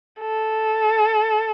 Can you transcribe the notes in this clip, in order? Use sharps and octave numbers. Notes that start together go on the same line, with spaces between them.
A4